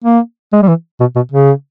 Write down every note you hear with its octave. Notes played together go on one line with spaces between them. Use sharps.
A#3
G#3
G3
E3
B2
B2
C#3